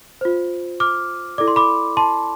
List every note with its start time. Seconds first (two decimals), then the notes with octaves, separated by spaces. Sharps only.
0.21 F4 C5
0.80 D6 F6
1.38 E4 A4 D5 D6
1.48 C6
1.56 B5 D6
1.97 A5 C6